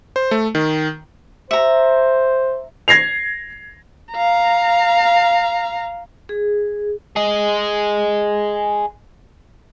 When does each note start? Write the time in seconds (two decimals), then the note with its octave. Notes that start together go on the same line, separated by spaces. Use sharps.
0.16 C5
0.31 A3
0.55 D#3
1.51 C5 E5 A#5
2.88 G#6 A#6 C7 F7
4.14 F5 A#5
6.29 G#4
7.16 G#4 D#5